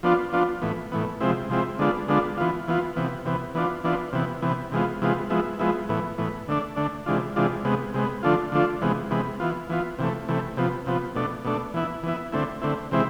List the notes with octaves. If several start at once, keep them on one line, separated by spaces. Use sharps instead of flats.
F3 B3 D4 F4
F3 B3 D4 F4
A2 E3 B3
A2 E3 B3
C3 F3 G#3 C4 E4
C3 F3 G#3 C4 E4
D3 G#3 B3 D4 F4
D3 G#3 B3 D4 F4
E3 B3 F4
E3 B3 F4
C3 E3 B3
C3 E3 B3
E3 B3 D4 F4
E3 B3 D4 F4
C3 E3 B3
C3 E3 B3
C3 E3 G#3 B3 F4
C3 E3 G#3 B3 F4
F3 G#3 B3 E4
F3 G#3 B3 E4
A2 E3 B3
A2 E3 B3
D3 A3 D4
D3 A3 D4
C3 E3 G#3 D4 F4
C3 E3 G#3 D4 F4
C3 G#3 B3
C3 G#3 B3
D3 F3 A3 D4 F4
D3 F3 A3 D4 F4
C3 E3 G#3 B3
C3 E3 G#3 B3
E3 B3 F4
E3 B3 F4
C3 E3 A3
C3 E3 A3
C3 F3 B3
C3 F3 B3
B2 A3 D4
B2 A3 D4
E3 B3 E4
E3 B3 E4
D3 A3 C4 E4
D3 A3 C4 E4
C3 E3 G#3 C4 E4